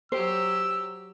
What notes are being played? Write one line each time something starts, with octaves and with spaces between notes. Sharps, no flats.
F#3 G4 C5 E6